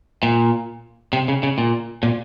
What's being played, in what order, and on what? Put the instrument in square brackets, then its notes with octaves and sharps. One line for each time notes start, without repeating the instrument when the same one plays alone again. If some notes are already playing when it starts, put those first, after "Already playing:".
[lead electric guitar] A#2
C3
C#3
C#3
A#2
A#2